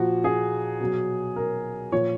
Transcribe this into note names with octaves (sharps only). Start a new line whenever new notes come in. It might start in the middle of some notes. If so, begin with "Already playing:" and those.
Already playing: A#2 F3 F#4
G#4
B2 F#3
A#4
A#2 F3 C#5